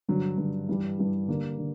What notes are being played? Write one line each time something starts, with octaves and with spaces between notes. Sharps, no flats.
G2 D3 F#3
G2 D3 F#3
G2 E3 G3
G2 E3 G3
D3 G3 A#3
D3